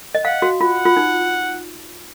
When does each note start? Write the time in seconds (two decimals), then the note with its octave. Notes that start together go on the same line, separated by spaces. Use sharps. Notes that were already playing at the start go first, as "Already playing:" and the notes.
0.15 D#5
0.24 F5 F#5
0.42 F#4
0.60 F4 F#5
0.85 F4
0.97 D#4